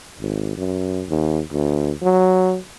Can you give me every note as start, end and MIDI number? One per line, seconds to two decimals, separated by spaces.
0.21 0.55 32
0.57 1.03 42
1.09 1.41 39
1.52 1.92 38
2.02 2.57 54